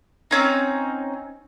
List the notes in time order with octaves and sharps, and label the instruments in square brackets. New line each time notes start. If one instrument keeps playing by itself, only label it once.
[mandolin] C4 C#4 D#4